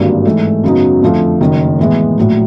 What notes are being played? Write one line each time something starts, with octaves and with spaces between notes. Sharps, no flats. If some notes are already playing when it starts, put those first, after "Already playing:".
Already playing: G#1 G2 D3 F#3 A#3
G#2 E3 A3
F#2 C#3 F#3 B3 D#4
F2 D3 F3 A3
F#1 F#2 D#3
A2 E3 G#3 B3
A#1 A2 F#3